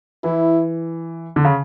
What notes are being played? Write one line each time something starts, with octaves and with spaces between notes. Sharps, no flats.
E3 E4
D3
C#3